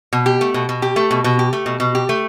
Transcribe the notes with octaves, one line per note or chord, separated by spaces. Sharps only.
B2
G4
A3
B2
B2
G4
A3
B2
B2
G4
A3
B2
B2
G4
A3